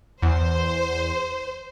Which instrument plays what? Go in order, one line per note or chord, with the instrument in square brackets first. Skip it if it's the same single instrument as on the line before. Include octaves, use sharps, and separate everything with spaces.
[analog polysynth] E2 [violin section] C5